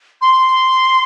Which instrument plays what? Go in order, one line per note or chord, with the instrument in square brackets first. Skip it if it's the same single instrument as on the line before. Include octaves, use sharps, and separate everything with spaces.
[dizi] C6